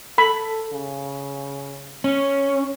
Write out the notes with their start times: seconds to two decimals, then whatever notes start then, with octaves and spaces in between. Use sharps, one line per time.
0.18 A4 B5
0.72 C#3
2.04 C#4